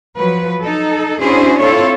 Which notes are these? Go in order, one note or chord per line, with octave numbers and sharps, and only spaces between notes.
F3 F#3 B4
D#4 A4
C#4 D4 E4 F#4 G#4 C5
C4 E4 F4 A4 C#5